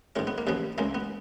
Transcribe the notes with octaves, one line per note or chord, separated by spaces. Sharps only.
G#2 D#3 G#3 C#4
B3
A#3
D#2 C#3 F3 B3
C#2 C#3 G#3 A#3
B3